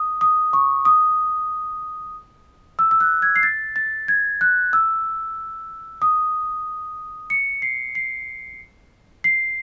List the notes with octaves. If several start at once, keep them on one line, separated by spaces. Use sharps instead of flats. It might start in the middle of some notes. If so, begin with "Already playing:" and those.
Already playing: D#6
D#6
C#6
D#6
E6
E6
F#6
G#6
C7
A6
A6
G#6
F#6
E6
D#6
C#7
C7
C7
C7